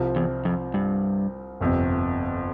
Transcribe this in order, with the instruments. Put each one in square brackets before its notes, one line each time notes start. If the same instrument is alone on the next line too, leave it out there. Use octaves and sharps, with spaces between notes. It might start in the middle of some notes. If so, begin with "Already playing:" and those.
Already playing: [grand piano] C2 C3 F3 C4 F4
[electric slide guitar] E2
F2
G2
[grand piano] G1 F2 C3